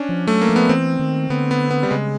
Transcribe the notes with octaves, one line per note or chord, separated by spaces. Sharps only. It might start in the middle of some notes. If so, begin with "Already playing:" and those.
Already playing: C#4 D4
F3
F#3 A3
A#3
F3
B3
E3 C4
D#3
D3 B3
B3
B3
G3
C#3 G#3